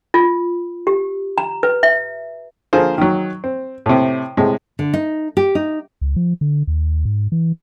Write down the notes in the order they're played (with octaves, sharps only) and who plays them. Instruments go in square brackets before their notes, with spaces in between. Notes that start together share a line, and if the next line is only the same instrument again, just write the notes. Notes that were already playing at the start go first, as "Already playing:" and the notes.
[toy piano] F4
G4
A#5
B4
E5
[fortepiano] D3 F3 A#3 F4 G#4 C5
D#3 F#3
C4
A2 C3
A2 C3 G#3
[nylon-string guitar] D3
D#4
G4
D#4
[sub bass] C#2
F3
D3
D#2
G#2
E3